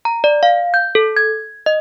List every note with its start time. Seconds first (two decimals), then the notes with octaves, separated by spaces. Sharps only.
0.05 A#5
0.24 D5
0.43 F5
0.74 G6
0.95 A4
1.17 G#6
1.66 D#5